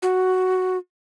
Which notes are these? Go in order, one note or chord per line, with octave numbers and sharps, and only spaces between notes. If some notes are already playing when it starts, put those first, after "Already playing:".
F#4